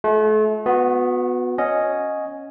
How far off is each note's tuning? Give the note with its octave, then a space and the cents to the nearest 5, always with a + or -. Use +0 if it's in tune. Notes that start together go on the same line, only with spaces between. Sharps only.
A3 -35 F4 +15
B3 +10 F#4 -30
C#4 +0 D#5 +0 F#5 +0